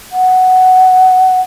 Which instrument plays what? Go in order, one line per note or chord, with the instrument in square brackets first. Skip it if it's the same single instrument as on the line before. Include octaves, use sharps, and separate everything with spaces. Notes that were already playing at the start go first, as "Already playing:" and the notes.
[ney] F#5